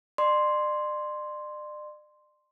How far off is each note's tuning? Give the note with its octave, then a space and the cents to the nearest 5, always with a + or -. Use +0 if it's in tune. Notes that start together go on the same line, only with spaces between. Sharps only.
D5 +40 C6 +0